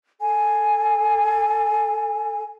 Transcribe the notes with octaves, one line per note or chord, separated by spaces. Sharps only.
A4 G#5